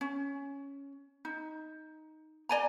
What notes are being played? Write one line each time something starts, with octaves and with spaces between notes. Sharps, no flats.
C#4
D#4
D5 G#5 A#5